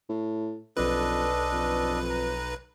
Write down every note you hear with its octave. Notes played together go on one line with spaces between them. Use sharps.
A2
B1 F2 D4 A4 B4 D#5
F2
A#5